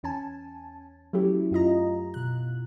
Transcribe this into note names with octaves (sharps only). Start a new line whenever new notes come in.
E2 C#4 G#5 A5
F#3 A3 C#4 E4 G4
F#2 F4 D#5 A#5
B2 F#6